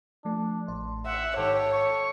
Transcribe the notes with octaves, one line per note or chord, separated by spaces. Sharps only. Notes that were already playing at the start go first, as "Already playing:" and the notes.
F3 A3 D4
A1 D5 C6
E5 F#5
G#2 D#3 G4 A4 C#5
C#6